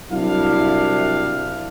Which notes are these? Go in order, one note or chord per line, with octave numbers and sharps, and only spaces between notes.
C2 F#3 G3 D4 E4 F5